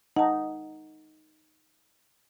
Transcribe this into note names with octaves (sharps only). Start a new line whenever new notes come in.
D#4 F#5 A5